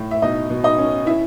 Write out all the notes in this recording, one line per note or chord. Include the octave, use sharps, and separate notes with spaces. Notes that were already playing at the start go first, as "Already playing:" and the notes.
Already playing: A2
E5
B2 D#4 D#5
B2
D#4 D#5
C#4
E4 E5